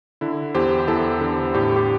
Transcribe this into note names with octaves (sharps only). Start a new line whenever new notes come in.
D3 E4
E2 G4 C5
E2 E4 A4
D3
A2 D4 G4
G4